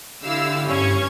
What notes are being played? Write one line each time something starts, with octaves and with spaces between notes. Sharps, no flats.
D3 E4 G4 F5 E6
G2 C#4 C#6 G#6